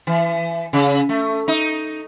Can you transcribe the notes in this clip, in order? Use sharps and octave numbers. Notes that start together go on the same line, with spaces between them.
E3
C#3
A3
D#4